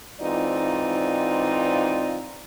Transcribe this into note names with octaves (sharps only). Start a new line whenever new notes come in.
G#2 E3 C4 D#4 F4 D5